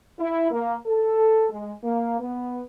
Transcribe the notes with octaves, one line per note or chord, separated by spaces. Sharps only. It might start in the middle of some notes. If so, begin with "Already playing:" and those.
E4
A#3
A4
G#3
A#3
B3